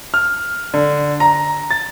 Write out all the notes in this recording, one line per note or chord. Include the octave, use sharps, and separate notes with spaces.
F6
D3
A#5
A6